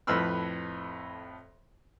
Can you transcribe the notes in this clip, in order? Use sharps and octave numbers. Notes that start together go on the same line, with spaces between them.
F2 A2 B4 B5 E6 F6